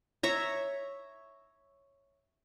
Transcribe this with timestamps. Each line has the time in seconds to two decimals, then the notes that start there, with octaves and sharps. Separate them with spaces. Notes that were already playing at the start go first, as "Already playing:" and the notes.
0.23 C#5 E5 A#5